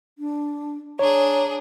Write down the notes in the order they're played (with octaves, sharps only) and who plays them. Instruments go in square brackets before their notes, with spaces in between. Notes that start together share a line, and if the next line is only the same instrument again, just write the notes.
[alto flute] D4
[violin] D4 G#4 [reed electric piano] C#5 [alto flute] A#5